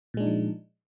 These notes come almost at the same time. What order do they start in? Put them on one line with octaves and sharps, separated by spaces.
A#2 G#3 D4 D#4 F3